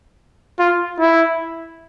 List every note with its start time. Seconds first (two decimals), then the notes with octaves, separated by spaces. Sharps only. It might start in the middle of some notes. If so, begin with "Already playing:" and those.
0.59 F4
0.99 E4